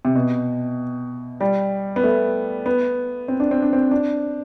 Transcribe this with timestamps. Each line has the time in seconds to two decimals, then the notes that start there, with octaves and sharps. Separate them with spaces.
0.05 C3
0.15 B2
1.41 G3
1.96 B3
2.04 A3
2.66 B3
3.28 C4
3.40 D4
3.51 C4
3.62 D4
3.73 C4
3.91 D4